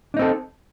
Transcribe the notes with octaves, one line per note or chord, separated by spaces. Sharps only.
C4 D4 D#4 A4